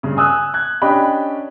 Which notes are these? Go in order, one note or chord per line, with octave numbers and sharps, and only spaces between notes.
G2 C#3
G#5 D#6 E6 F#6
F#6 G#6
C#4 D4 G4 D#5 B5